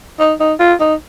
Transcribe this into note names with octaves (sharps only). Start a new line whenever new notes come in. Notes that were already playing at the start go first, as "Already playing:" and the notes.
D#4
D#4
F4
D#4